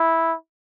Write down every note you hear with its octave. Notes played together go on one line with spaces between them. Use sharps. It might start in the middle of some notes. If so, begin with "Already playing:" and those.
Already playing: E4